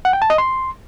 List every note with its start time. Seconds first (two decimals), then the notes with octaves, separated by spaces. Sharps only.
0.05 F#5
0.13 G5
0.22 A5
0.30 D#5
0.38 C6